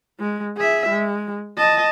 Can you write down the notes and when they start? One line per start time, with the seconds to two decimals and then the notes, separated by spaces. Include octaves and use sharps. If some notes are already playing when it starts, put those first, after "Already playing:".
0.20 G#3
0.57 G#4 E5
0.89 G#3
1.57 D#5 A5